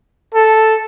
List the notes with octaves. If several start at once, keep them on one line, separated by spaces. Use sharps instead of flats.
A4